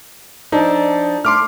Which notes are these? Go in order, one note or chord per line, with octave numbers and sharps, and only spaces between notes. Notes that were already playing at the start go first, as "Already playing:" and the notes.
F3 D4 D#4 A4
A3 C6 D6 F6